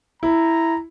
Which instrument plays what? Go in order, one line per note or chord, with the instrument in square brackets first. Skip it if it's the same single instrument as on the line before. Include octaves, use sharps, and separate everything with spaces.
[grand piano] E4 [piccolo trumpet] A#5